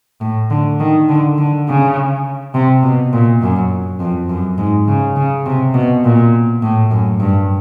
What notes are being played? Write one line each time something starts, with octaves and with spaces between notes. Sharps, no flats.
A2
D3
D#3
D3
D3
C#3
C3
B2
A#2
F#2
F2
F#2
G#2
C#3
C#3
C3
B2
A#2
A2
F#2
G2